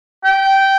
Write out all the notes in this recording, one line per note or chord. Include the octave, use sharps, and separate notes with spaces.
G5